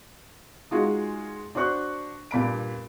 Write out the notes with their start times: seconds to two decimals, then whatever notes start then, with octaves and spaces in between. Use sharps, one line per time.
0.71 G#3 D#4 F4 F#4 G#4
1.55 D4 F#4 C5 C#6 F#6
2.31 G2 A#2 B5 D7